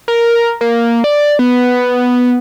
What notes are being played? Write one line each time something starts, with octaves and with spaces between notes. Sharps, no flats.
A#4
A#3
D5
B3